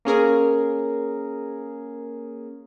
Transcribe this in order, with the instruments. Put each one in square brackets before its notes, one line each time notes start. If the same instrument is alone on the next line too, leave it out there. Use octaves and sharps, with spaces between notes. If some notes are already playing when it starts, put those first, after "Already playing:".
[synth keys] A#3 C#4 G#4 A#4